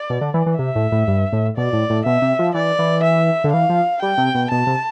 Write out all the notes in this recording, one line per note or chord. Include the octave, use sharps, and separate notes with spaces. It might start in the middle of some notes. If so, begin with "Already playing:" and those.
Already playing: D5
B2
D3
E3
E3
C3 E5
A2
A2
G2
A2
B2 D5
A2
A2
B2 E5
C3
F3
E3 D5
E3
E5
D3
E3 F5
F3
G3 G5
C3
B2
B2 A5
C3